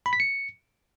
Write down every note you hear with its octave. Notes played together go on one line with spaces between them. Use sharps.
B5
B6
C#7